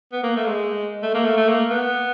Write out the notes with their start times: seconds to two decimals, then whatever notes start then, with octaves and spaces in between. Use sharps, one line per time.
0.12 B3
0.23 A#3
0.36 A3
0.46 G#3
1.03 A3
1.14 A#3
1.25 A3
1.37 A3
1.48 A#3
1.70 B3